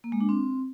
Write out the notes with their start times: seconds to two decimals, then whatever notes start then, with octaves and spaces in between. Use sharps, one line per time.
0.04 A#3
0.12 G#3
0.21 D4
0.29 C4